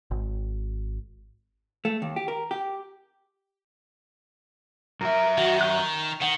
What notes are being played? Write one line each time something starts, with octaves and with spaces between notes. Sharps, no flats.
G#1
A3
D#2
G4
A#4
G4
F#2 A#4 E5
D#3 F#4
C#6 F#6
D#3 F#5